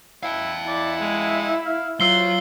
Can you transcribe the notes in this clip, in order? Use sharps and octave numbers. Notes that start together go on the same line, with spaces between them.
E4 F5 G5
E4 D5
G#3
F5
F#3 F4 C5 E6 C7 G7